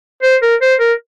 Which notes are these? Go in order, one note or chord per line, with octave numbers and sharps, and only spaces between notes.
C5
A#4
C5
A#4